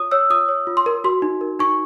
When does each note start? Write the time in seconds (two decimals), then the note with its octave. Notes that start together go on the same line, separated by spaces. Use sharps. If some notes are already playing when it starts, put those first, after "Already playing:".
Already playing: F4 C#5 D#6
0.11 C#5 E6
0.30 F4 D#6
0.48 C#5
0.67 F4
0.77 C6
0.86 A#4
1.04 F#4 C6
1.22 D#4
1.41 A#4
1.59 D#4 C#6